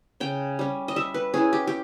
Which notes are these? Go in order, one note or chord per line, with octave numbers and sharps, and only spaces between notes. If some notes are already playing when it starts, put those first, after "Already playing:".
C#3 G5
G3 C#4
D#5
G3 E5
B4
C#4 E4 G#4
G4
G4